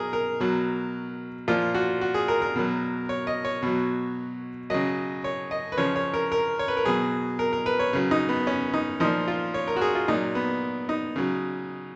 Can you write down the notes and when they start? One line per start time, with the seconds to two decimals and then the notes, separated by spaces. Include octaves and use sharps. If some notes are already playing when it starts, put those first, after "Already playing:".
Already playing: B2 F#3 G#4 A#4
0.13 A#4
0.40 B2 F#3
1.48 A#2 F3 F4
1.75 F#4
2.01 F#4
2.14 G#4
2.28 A#4
2.42 A#4
2.56 B2 F#3
3.09 C#5
3.27 D#5
3.45 C#5
3.63 B2 F#3
4.70 C#3 F#3 D#5
5.24 C#5
5.51 D#5
5.72 B4
5.77 C#3 F3 C#5
5.96 C#5
6.14 A#4
6.32 A#4
6.59 C#5
6.68 B4
6.77 A#4
6.85 B2 F#3 G#4
7.39 A#4
7.53 A#4
7.66 B4
7.79 C#5
7.93 C#3 F#3
8.11 D#4
8.29 B3
8.47 C#4
8.74 D#4
9.00 A#2 F3 D#4
9.28 F4
9.54 C#5
9.68 A#4
9.76 F#4
9.81 G#4
9.95 F4
10.08 A#2 F#3 D#4
10.35 B3
10.89 D#4
11.16 C#3 F#3